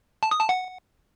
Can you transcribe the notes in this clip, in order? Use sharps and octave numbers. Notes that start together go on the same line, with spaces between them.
A5
D#6
A5
F#5